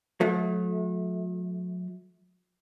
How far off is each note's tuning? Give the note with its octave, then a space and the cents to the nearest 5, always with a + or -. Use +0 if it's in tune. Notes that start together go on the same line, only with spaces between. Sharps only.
F#3 -45 A3 -30